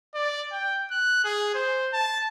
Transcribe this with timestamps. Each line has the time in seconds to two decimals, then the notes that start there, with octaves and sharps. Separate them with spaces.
0.14 D5
0.52 G5
0.91 F#6
1.24 G#4
1.54 C5
1.93 A5